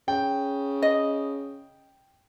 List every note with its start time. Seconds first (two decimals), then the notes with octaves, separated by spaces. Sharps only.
0.08 C#3 G5
0.82 D#5